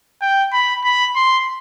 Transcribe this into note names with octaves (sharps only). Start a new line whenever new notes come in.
G5
B5
B5
C6